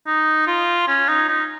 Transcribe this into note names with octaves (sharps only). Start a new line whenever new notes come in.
D#4
F4
C#4
D#4
D#4